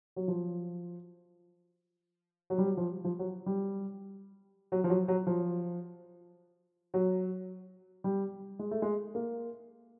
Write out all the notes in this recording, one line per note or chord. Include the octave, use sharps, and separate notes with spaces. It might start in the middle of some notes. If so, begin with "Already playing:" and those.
F#3
F3
F#3
G3
F#3
F3
F3
F#3
G3
F#3
F3
F#3
F#3
F3
F#3
G3
G#3
A3
G#3
A#3